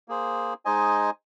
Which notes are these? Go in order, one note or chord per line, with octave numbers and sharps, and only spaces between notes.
A#3 G#4 C5
G#3 D#4 C5 D#5 G#5